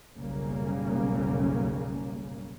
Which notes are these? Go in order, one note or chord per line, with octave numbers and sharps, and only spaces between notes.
F#1 B1 C#3 G3 A#3 C#4